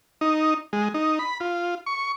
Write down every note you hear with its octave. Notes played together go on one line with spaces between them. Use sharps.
D#4
G#3
D#4
B5
F4
C#6